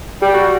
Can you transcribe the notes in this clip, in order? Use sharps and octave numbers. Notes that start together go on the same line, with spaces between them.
G3 G4
F#4